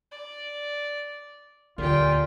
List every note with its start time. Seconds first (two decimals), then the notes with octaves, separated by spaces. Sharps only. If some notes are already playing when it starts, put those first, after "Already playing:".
0.11 D5
1.78 D2 A#2 F4 G4 G5